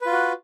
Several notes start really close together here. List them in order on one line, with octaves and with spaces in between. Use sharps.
B4 F4 F#4